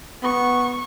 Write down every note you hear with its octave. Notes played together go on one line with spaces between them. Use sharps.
B3 C#6